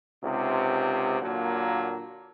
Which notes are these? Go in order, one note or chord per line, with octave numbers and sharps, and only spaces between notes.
C#2 G#2 C3
A#2 D3 F#3 A#3